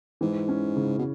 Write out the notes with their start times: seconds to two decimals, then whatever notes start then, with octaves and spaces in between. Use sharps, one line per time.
0.21 G#2 E3
0.48 C#4
0.76 C#3
0.99 B2